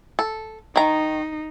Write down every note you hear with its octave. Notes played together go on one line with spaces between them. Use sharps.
A4
D#3 D#4 A#5